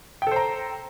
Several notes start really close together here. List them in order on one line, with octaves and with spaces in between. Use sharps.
G5 A4 C5 A#5